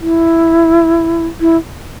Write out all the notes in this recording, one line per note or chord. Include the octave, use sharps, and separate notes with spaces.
E4
E4